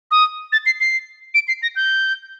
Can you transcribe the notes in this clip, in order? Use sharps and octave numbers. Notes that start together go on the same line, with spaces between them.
D#6
A6
C7
C7
D7
C7
A#6
G6